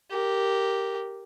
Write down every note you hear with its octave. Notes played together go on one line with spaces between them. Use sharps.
G4 A#4